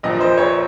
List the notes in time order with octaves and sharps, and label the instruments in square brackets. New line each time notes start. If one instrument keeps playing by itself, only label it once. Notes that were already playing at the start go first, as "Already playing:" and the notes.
[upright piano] A#1 A#2 F3 D#5
C5
C#5